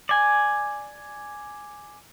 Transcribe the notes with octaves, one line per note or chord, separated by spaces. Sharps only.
D5 G#5